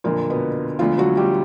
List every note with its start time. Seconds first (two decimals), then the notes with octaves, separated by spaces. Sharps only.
0.04 F#1 F2 A#2 D3 F3 A#3
0.30 B2 B3
0.79 E1 D2 D3 F3 F4
0.98 F#3 F#4
1.17 G3 G4